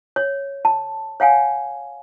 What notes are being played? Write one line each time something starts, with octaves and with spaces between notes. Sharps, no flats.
C#5
A5
C#5 F5 F#5 G#5